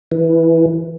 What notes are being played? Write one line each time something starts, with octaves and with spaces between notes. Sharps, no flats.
E3